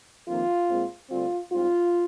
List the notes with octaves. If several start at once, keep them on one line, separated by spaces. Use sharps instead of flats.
F2 C3 D#3 A#3 F4
A#2 G#3 C4
D2 D3 G3 C4 F4
G#2 G3 C4 F4